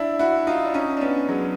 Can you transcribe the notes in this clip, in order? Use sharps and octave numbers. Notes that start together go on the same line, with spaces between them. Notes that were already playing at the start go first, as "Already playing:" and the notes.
Already playing: D4 E4
E4 F#4
D#4 F4
D4
C#4 D#4
D4
B3 C#4
F#3 G#3